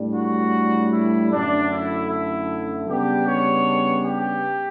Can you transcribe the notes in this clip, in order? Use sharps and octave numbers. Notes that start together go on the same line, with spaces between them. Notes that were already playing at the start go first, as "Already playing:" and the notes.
Already playing: A2 G3 D4
F#4
E4
F#2 D3 A3 D4
E4
E4
C#3 G3 B3 D4 G4
C#5
G4